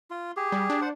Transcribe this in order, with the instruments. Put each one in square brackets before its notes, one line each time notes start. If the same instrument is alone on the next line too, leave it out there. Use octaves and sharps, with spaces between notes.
[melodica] F4
G4 G#4
[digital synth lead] G3
D4
[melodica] C5 F#5